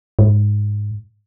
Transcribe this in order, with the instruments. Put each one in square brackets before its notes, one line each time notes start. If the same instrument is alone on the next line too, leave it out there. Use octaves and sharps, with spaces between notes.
[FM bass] G#2